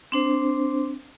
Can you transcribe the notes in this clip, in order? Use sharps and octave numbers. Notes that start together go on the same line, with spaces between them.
C4 D4 C5